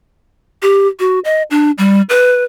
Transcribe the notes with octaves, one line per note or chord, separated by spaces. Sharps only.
G4
F#4
D#5
D4
G3
B4